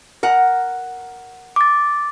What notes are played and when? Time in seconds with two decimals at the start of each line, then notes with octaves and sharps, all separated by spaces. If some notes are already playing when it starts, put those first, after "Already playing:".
0.23 A#4 F#5
1.56 D6 A6